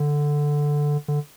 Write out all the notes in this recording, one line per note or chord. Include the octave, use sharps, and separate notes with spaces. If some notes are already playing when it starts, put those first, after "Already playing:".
Already playing: D3
D3